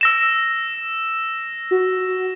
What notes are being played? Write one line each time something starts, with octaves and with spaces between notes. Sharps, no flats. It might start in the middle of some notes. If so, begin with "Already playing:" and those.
E6 A#6 E7
F#4